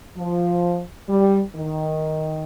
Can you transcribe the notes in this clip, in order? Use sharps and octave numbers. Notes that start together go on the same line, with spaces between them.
F3
G3
D#3